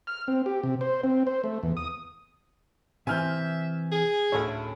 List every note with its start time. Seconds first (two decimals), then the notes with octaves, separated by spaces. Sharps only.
0.07 F6
0.28 C4
0.46 G4
0.63 C3
0.81 C5
1.04 C4
1.27 C5
1.44 A3
1.63 E2
1.77 D#6
3.07 C3 E3 E5 G#5 F6 G6
3.92 G#4
4.32 D2 A2 C#4 A4 C#5